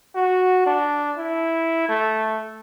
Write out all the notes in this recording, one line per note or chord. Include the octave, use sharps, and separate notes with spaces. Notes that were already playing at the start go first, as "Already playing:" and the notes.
F#4
D4
E4
A3